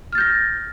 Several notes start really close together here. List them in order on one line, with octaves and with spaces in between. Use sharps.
F6 A6 G6 A#6